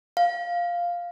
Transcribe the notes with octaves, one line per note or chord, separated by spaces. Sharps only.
F5